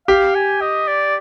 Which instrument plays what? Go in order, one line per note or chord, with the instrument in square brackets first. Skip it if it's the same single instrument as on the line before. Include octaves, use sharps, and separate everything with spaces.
[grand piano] G4 [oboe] F5
[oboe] G#5
D#5
D5